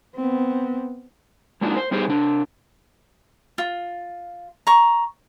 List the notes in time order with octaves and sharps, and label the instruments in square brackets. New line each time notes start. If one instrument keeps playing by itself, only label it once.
[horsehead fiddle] B3 C4
[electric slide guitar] G#3 A#3 D4 D#4 F4 F#4
C5
G3 B3 D#4 G4 G#4 C5
C3 D4
[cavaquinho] F4
A#5 C#6